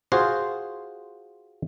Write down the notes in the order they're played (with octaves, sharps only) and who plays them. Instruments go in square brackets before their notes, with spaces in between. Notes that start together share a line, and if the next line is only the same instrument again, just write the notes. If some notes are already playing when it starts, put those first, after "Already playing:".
[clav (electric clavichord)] F4 F#4 G#4 C5